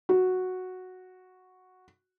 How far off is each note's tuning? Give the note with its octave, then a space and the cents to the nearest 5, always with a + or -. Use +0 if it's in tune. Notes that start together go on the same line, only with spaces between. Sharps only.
F#4 -5